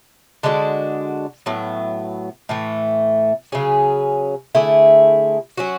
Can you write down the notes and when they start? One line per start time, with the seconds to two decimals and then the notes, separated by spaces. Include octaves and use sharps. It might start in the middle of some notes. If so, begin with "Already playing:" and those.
0.43 D3 G#3 D4 F#4
1.46 A2 F#3 B3
2.49 A2 E3 A3
3.52 C#3 F#3 C#4 G#4
4.55 D3 A3 E4 G#4
5.57 F#3 C#4 F#4